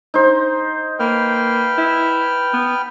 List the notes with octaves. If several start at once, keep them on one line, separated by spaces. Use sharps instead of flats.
D#4 C5
A#3 B4 G5 F6
E4
B3